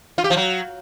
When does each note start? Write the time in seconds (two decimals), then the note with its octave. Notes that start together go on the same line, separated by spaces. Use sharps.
0.18 F4
0.24 G4
0.30 F3
0.37 F#3